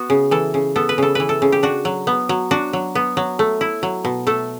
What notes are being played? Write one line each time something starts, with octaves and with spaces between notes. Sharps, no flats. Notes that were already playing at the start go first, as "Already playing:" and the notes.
Already playing: B3 F#4
C#3
E3 A4
C#3
B3 A4
B4
C#3 A4
E3 B4
A4
C#3
G4
D4 F#4
F#3
B3
F#3
D4 F#4
F#3
B3
F#3
A3
E4
F#3
B2
A3 A4